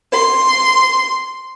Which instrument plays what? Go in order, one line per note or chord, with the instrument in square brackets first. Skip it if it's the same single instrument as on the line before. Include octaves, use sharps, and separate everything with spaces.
[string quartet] C6